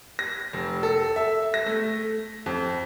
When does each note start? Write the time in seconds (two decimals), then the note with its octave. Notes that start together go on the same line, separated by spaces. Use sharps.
0.19 A#6
0.53 F1
0.83 A4
1.16 E5
1.54 A#6
1.66 A3
2.46 F2